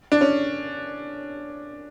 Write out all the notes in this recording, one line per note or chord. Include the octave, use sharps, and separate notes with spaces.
D4
C#4